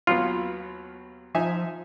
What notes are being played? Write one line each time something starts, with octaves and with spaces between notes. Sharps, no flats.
D#2 F#3 B3 F4
F3 D#4 E5 G#5